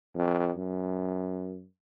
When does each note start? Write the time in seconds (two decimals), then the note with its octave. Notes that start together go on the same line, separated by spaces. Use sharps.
0.15 F2
0.56 F#2